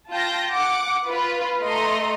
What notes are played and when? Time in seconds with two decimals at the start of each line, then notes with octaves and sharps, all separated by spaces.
0.10 F4 G5 A5 G6 A#6
0.52 F#5 D6
1.06 F4 B4
1.62 A3 A4 D#5 A#5 C6